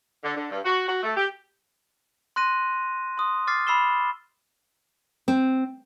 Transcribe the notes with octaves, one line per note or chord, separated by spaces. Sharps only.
D3
D3
G2
F#4
F#4
A3
G4
C6 F#6 A#6 D#7
C6 D#6
D6 F6 A6 C7
B5 E6 C7 E7 G7
C4